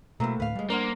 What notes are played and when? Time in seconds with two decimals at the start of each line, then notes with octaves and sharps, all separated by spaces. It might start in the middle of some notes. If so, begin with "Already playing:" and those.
0.20 B2 F#3 A3 A#3 C4 E4
0.40 D2 A2 B4 F5
0.55 D2 G3 G#3
0.70 A#3 D4 A#4 C5 F#5